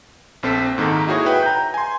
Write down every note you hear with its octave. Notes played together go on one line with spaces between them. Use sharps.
A#1 C4 A4 C5 B6
G#2 D#3 A#3 A4 A#5
D#4 E4 F#4 G#4 C#5
B4 E5 G5
A#5 G6
G#5 C6